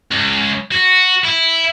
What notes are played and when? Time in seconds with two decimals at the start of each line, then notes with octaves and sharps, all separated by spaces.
0.11 C#2
0.72 F#4
1.25 E4